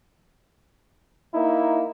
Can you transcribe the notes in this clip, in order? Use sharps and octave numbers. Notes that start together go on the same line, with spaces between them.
A#3 D#4 E4